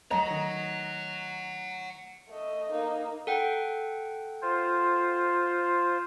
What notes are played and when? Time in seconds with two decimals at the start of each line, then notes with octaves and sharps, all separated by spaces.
0.11 F#3 A3 C#5 D#5 F#5 A#5
0.31 D#3
2.29 A3 D#5
2.72 A#3 D#4
3.27 A4 F#5 G5
4.42 F4 C5